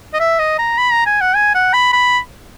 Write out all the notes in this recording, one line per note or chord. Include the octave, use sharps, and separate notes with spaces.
D#5
E5
D#5
A#5
B5
A#5
G#5
F#5
G#5
F#5
B5
B5